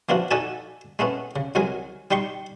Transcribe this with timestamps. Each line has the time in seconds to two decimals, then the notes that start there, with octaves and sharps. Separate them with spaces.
0.09 E3 F3 B3 D4 F4 F#4
0.31 D#4 F#4 A4 D5 G#5 A5
0.99 G#3 A3 B3 C#4
1.36 C#3
1.55 C2 F#3 G#3 A#4 G#5
2.11 G3 D#4 G5 C6 C#6